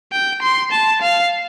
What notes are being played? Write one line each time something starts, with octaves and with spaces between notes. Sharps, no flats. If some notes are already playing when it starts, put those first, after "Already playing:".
G5
C6
A5
F5